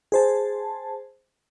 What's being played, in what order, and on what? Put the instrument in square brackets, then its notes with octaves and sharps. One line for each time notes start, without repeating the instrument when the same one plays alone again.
[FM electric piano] G#4 C5 A5